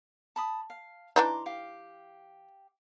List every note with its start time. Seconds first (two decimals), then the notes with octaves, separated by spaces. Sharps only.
0.36 A5 B5 D#6
0.70 F5
1.16 E3 D4 D#4 A#5 C6 D6
1.46 G4 F5